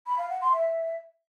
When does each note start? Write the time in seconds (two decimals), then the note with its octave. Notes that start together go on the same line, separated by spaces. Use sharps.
0.06 B5
0.18 F5
0.30 F#5
0.41 C6
0.53 E5